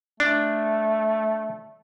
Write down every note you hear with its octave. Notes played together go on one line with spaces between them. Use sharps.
A3 D4